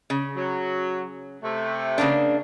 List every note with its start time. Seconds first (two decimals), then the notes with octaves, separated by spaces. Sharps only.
0.10 C#3
0.35 F#3
1.42 C3 A3
1.98 C#3 A#3 D4